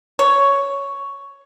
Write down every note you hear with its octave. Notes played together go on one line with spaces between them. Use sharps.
C#5